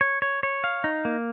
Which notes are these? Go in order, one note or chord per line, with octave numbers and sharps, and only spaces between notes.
C#5
C#5
C#5
F5
D#4
A#3